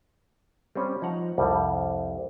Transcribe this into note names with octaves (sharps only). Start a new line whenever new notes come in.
G3 C4 C#4
F3 D#4 F#5 A#5
C2 F2 G3